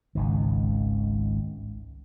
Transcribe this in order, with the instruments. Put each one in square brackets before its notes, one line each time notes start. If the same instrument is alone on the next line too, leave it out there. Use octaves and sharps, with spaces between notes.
[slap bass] G#1 C#2 D#3